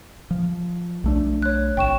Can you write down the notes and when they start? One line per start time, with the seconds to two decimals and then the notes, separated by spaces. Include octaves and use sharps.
0.31 F3
1.04 B1 A3 D4
1.42 C#5 F#6
1.77 G#1 G5 C#6 E7